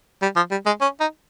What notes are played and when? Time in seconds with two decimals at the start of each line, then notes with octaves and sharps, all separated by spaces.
0.22 G3
0.36 F3
0.51 G3
0.66 G#3
0.81 C#4
1.00 D#4